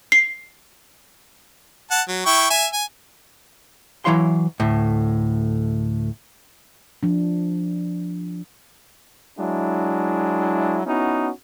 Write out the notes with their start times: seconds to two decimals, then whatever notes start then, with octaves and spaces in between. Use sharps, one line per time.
0.12 C7
1.91 F#5 A5
2.08 F#3
2.26 E4 G5 C#6
2.50 E5 G#5
2.73 G#5
4.05 E3 F#3 E4 C#5 F5 C6
4.60 D2 A2
7.03 F3 D4
9.39 F#3 G#3 D4 E4
10.87 B3 C#4 D#4 E4 F#4